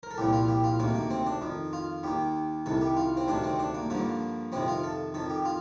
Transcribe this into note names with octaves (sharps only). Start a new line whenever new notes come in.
A#4
A4
C2 A#2 F3 G4
F4
G4
F4
D2 C3 D#3 A#3
A#3
C4
D4
F2 D#3
F4
D#2 D#3 G4
C2 C3 D#3 A4
G4
F4
C4
D2 C3 D#3 D4
C4
D4
A#3
G2 D3 F3 A#3
F2 C3 D#3 C4
F4
A4
F2 D#3 A4
G4
F4